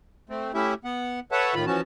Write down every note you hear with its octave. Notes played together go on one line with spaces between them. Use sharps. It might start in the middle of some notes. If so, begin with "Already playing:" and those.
A3 C4
A3 C#4 E4 G4 E5
B3 F#5
A4 B4 C#5 E5 F#5 A5
A2 D#3 F4 B5
E3 F3 C#4 F#4 A5